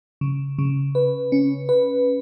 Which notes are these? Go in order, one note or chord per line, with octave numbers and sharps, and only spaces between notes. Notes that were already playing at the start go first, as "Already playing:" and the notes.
C#3
C#3
B4
C#4
B4